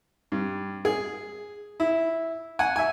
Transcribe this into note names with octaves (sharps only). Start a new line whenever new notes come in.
G2
G#4
E4
F#5 G#5
E5 G#5